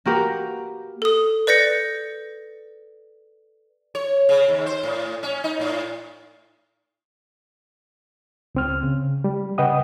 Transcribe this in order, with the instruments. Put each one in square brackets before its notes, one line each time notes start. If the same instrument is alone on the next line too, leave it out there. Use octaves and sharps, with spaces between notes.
[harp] A#3 F#4 G4 A#4 B4
[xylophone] A4 D#6
B4 D5 G6 A#6 C#7
[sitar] C#5
C#3
D#2
C5
A2
C#4
D#4
A2
[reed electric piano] C#2 C4 F6
C#3
G3
C#3 B4 D#5 F#5 G5 D#6